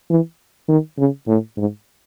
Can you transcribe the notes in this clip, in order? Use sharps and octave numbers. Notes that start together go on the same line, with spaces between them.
E3
D#3
C#3
A2
G#2